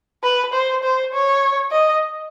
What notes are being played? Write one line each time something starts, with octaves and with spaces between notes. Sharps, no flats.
B4
C5
C5
C#5
D#5